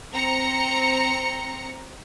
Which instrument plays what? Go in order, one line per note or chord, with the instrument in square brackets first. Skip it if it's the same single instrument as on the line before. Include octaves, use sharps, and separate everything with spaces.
[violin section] C4 A#5 C#7